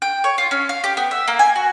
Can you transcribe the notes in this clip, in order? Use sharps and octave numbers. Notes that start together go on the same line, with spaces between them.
G5
C#5
F4
C#4
F5
G4
B3
E5
A#3
G#5
F#4